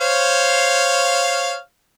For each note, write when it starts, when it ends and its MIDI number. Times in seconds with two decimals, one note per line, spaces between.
0.01 1.56 72
0.01 1.56 73
0.01 1.56 77